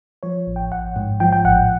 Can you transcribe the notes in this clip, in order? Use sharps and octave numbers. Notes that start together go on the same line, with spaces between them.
F3 C#5
A1
G5
A1 F#5
G#2
F3 G5
G5
A1 F#5